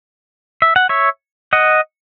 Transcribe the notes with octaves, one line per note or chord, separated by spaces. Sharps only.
E5
F#5
C#5 E5
D#5 F#5